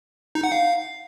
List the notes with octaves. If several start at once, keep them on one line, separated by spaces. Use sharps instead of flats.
D#4
F#5
F5